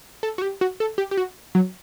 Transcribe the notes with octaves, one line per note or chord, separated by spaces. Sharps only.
A4
F#4
G4
F#4
A4
G4
G4
F#4
F#3